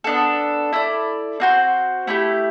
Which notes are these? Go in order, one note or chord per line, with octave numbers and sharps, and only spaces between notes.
B3 D4 A4
E4 A4 D5
C4 F#4 C5
A3 E4 G4